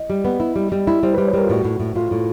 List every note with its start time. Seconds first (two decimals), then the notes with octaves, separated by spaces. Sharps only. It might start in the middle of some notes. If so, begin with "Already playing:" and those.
Already playing: D#5
0.10 G3
0.25 B3
0.40 E4
0.56 G3
0.72 G3
0.87 E4
1.03 G3 C5
1.14 G3 B4
1.26 C#5
1.34 G3 A#4
1.45 F4
1.49 A2 F#4
1.65 A2
1.80 A2
1.95 A2 F4
2.11 A2